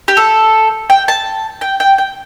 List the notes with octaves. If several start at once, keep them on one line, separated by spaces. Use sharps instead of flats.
G4
A4
G5
A5
G5
G5
G5